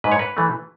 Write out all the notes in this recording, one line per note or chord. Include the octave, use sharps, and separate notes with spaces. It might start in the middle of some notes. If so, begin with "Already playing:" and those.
G#2 B4
C#5
B4
E3 A3